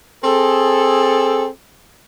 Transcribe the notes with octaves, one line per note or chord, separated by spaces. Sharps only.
C4 G#4 A4